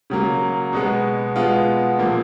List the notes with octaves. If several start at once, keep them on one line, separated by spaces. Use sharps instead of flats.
C#3 F#3 A#3
B2 G#3 B3
B2 G#3 B3 F4
A#2 F3 A#3